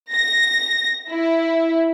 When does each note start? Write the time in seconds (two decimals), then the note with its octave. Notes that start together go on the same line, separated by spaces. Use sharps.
0.13 A#6
1.09 E4